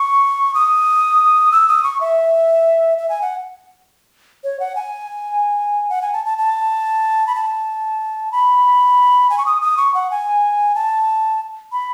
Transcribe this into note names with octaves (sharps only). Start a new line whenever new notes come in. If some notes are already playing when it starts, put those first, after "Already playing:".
Already playing: C#6
D#6
E6
D#6
C#6
E5
E5
G#5
F#5
C#5
F#5
G#5
F#5
G#5
A5
A5
A5
B5
A5
B5
G#5
C#6
D#6
D#6
C#6
F#5
G#5
A5
B5